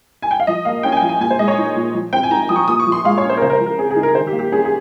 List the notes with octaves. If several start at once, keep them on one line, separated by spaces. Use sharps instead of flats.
G#5
G5
F5
F3 D#5
A#3 F5
C#4 G5
G#5
G5
F3
G#5
A#2 G#5
C5
G#3 D#5
C#5
D#4
A#2
F3
C4 G5
G#5
D#4 A#5
F3 D#6
C#6
A#2 D#6
C#6
F3
C6
G#3 F5
C#5
C#4
C5
A#4
C#3 C5
A#4
C5
F3
A#4
C4 G#4
G#4
D#4
A#4
D#3 C5
G4
A#3
G4
C#4 G#4
G#4